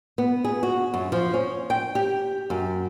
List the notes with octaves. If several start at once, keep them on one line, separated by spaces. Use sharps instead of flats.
B3
G#4
F#4
F#2
F3
C#4
G5
G4
F#2